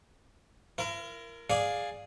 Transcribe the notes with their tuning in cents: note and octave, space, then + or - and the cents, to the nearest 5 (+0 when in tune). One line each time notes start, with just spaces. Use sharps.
E4 +45 A#4 +0
G#4 +0 D5 +5 F5 +10